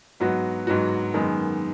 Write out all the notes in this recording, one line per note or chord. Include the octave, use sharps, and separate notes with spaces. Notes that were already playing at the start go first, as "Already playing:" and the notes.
G#2 F#3 B3 F#4
G#2 F#3 B3 F#4
F#2 D#3 G#3 B3 D#4